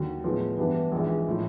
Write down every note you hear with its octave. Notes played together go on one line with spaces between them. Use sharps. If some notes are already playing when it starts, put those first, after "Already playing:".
Already playing: D#2 D3 F#3
A2 F3 G#3 B3
G2 E3 G3 B3 D4
A#1 G#2 E3
A2 F3